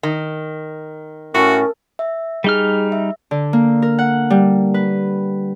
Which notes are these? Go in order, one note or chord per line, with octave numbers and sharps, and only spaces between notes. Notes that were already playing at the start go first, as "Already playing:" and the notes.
D#3
A2 C#4 F#4 A#4
E5
G3 D#4 G#4 F6
E5
D3
A#3
A#4
F#5
G3
B4